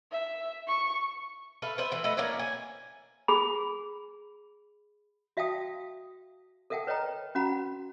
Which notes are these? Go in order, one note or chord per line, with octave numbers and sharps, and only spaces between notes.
E5
C#6
A4 B4 E5 F5
B4 C5 E5
E3 A3
A3 B4 D#5
A#3 C#4 D4 E4
G#5
G#4 B5
F#4 E5 F5 G5 A5 D#6
A4 A#4 E5 F#5 G5 A5
B4 C#5 D#5 G5 A#5
C#4 F#4 F#5 A#5 B5